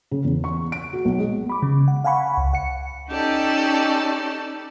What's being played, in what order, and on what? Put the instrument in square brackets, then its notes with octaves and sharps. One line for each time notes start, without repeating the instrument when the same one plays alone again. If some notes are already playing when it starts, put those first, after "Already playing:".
[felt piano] C#3
E2
C#6
D7
F#4
B1
G#3
[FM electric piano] B5 D6
C#3
F#5
F5 F#5 G#5 B5 C#6
C#2
F#5 C#7
[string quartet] C#4 D#4 G4 A4 D5